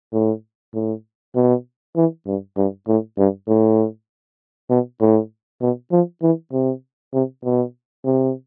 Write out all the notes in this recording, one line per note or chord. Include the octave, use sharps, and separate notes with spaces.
A2
A2
B2
E3
G2
G2
A2
G2
A2
B2
A2
B2
F3
E3
C3
C3
B2
C3